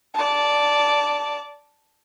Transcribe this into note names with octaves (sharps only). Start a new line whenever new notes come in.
D5 A5